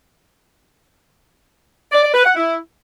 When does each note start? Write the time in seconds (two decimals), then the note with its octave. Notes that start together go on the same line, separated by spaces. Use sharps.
1.92 D5
2.03 D5
2.14 B4
2.25 F#5
2.36 E4